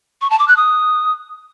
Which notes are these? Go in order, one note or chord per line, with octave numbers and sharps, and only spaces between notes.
C#6
A5
D6
F#6
D#6